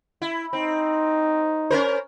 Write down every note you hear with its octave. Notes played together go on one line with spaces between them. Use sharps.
E4
C4 D#4
C#4 A#4 C5